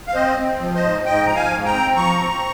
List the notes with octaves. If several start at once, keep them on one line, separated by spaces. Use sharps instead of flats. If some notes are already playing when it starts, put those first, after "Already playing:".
F5
C4 C5 D#5
C4
F3
C5 D#5
G#2
G#2 D#5 G5
F3 A#5
F5 G#5
G#2
G5 A#5
C4
F3 A#5 C#6
C4